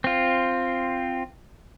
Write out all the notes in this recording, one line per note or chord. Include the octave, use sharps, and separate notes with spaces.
C4 F4